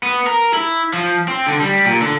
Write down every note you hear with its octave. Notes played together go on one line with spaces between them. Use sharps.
B3
A#4
E4
F3
C4
D3
G3
A#2
D3